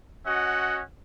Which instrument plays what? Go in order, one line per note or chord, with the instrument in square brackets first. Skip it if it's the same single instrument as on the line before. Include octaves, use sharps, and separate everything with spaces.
[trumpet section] C#4 F#4 D#5 F#5